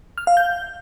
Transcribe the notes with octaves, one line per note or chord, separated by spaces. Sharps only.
F6
F5
G6